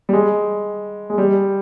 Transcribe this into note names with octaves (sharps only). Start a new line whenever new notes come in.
G3
G#3
G#3
G3